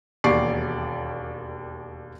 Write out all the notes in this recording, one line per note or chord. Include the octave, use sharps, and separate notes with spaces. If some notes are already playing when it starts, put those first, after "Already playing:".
E1 D#2 G4 D5 C#6 C7